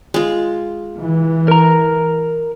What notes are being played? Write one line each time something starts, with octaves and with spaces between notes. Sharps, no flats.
G#3 F4
E3
A#4 A#5